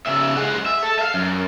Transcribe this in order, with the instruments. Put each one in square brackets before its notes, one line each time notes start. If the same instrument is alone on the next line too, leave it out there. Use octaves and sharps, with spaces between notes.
[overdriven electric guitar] C#3 E5
G#3 F#5
E5
A4
E5 F5
F#2